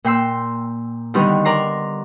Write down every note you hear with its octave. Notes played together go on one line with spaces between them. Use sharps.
A#2 G5 C6 E6
D3 D#3 G3 B3
A#4 D5 A#5 C6